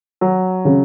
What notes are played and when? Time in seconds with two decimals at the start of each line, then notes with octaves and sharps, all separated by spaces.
0.21 F#3
0.65 C#3